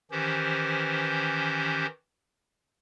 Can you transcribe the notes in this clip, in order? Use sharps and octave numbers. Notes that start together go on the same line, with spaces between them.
D#3 E3 C#4 G4 C5